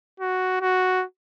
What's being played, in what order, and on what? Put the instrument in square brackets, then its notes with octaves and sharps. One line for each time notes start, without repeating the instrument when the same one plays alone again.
[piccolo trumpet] F#4
F#4